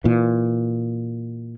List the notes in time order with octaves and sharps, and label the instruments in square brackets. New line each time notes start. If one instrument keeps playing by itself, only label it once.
[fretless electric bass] A#2 E3